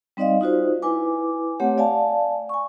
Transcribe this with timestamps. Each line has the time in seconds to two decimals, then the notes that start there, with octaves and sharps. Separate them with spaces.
0.17 G3 C4 D#4 D5 D#5 F5
0.41 D#4 F4 F#4 C5
0.82 E4 B4 G#5 D6
1.60 A3 C4 G4 C#5 F#5
1.78 D5 F5 G#5 A5
2.49 G#5 C#6